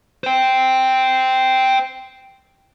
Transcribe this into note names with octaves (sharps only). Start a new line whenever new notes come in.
C5 G5